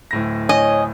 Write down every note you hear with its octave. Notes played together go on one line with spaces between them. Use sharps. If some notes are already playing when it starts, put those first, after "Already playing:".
D1 A2 A#6
C#5 D#5 G#5